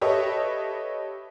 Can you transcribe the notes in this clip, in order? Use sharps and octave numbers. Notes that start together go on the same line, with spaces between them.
G4 A4 B4 C#5 D#5 E5